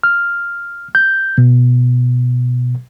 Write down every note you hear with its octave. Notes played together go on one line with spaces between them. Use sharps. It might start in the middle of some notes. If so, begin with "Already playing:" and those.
F6
G6
B2